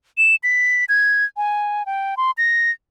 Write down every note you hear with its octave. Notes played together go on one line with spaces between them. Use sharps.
E7
B6
G#6
G#5
G5
C6
A#6